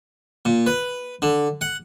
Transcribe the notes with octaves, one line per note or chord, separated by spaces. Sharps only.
A#2
B4
D3
F#5